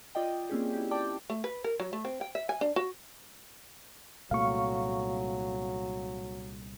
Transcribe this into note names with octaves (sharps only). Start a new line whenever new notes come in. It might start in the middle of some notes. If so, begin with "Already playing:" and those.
F4 D5 D#5 G5
A#3 C4 C#4 G4 G#4
E4 G4
D5 G5 A5 D6
A3
B4
A#4
F#3
A3
C4
G5
E5
G#5
D4
F#4
C2 A#2 F#3 A3 F5 C#6